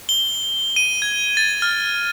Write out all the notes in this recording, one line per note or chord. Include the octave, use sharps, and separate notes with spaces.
G7
D#7
G#6
A6
F6